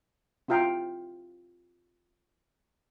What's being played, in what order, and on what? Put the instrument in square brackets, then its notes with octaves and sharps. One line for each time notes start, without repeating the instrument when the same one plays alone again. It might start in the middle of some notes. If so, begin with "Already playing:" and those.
[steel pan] C4 E4 F4 F5 G5